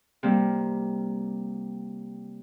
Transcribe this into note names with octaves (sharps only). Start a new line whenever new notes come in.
C3 G3 A#3